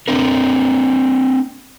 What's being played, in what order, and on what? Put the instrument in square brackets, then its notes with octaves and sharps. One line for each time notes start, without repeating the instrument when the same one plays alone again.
[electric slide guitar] C4 D4 A#4